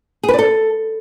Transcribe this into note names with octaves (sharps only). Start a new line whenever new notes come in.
G#4
B4
D5
A4